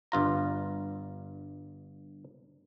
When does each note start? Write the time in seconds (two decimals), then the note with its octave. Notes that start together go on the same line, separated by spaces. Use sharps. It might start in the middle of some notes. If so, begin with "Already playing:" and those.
0.12 G1 G2 F4 A#5